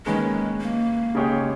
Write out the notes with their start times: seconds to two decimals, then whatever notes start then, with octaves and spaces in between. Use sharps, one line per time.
0.06 D#3 G#3 A#3 C#4 G#4 B4
0.61 A#3
1.15 C#3 G#3 D#4 G4 C#5